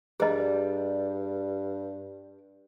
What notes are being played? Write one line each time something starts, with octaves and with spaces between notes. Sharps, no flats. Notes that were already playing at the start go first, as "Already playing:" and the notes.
G2 G3 G#4 D#5